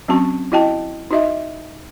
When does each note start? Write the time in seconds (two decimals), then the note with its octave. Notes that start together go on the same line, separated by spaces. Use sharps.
0.08 F#3 C4 C#4 F#4 A5 C#6
0.52 E4 F#4 D#5 G5 A5
1.11 D#4 F#4 D#5 E5